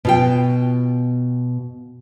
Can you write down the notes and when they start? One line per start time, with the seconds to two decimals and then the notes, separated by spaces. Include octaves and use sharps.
0.05 B2 F4 G5